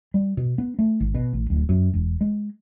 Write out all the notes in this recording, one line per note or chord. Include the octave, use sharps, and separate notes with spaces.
G3
B2
B3
A3
G#1
B2
A1
D1
F#2
E1
G#3